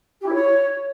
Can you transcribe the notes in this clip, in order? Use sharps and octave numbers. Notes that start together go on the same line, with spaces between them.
G4
E4
C#5